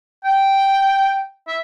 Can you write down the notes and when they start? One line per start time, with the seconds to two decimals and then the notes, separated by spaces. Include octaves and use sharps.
0.24 G5
1.48 E5